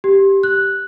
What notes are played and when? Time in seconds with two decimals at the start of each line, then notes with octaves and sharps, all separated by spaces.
0.04 G4
0.43 F#6